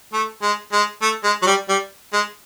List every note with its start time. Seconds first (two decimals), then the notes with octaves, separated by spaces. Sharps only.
0.13 A3
0.42 G#3
0.72 G#3
1.02 A3
1.24 G#3
1.42 F#3
1.46 G3
1.69 G3
2.13 G#3